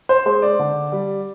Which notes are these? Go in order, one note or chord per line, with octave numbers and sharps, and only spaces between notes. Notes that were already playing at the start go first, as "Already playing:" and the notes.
C5
G#3 C5
D5
D3
G3